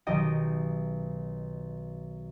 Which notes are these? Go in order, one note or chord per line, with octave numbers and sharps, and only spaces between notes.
B1 D#3 G4 D#5 G5